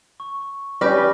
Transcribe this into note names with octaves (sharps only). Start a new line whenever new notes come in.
C#6
G3 C#4 G4 B4 D5 D6 F6 A#6